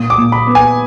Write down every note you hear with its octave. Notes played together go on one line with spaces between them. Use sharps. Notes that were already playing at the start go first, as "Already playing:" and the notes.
Already playing: A#2 D#6
D6
A#2
B5
B3
G#5